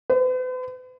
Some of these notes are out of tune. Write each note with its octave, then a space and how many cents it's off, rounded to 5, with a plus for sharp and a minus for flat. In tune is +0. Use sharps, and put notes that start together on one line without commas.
B4 +45